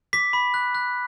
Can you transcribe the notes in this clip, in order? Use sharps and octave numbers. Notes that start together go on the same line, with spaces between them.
D6 B6
B5
F#6
F#6